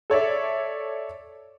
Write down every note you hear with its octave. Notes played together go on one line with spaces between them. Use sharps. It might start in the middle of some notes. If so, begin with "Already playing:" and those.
A4 C#5 D5 E5